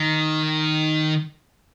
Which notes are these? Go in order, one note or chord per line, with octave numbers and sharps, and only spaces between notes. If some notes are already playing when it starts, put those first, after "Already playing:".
Already playing: D#3